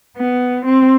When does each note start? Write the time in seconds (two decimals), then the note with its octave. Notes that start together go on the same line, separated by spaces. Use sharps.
0.17 B3
0.65 C4